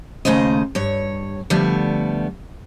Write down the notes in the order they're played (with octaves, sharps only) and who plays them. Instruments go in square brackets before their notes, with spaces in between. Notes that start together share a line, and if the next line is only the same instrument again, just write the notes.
[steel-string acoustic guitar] D#2 C#3 A3 C5 D#5
G2 C#5
D3 F3 G3 A3 B3